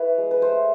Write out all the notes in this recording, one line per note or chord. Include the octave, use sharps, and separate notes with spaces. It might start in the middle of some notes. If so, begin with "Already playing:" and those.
Already playing: E4 B4 C#5
G#3
B4
A3 C5